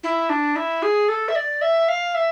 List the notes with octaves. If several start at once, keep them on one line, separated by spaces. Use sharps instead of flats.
E4
D4
E4
G#4
A4
E5
D5
E5
F5
E5